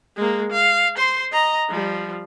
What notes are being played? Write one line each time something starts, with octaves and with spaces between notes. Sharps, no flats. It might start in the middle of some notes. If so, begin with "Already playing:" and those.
G#3 A#3
F5
C5 C6
D#5 A#5
F3 G3